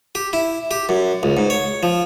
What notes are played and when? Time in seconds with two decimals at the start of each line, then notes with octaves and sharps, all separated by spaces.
0.15 G4
0.33 E4
0.71 G4
0.89 F#2
1.23 C#2
1.37 G#2
1.50 C#5
1.83 F3